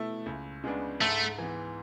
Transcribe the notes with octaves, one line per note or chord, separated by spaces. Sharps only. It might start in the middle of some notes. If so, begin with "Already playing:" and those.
Already playing: B2 A3 E4
C#2
C#3 G#3 B3 D4
G#2 A3
E3 B3